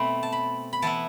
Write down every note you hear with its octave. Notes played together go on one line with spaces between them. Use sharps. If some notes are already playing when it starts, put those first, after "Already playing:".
Already playing: B2 A3 C4 B5
A5
B5
B5
E3 B3 E4 A5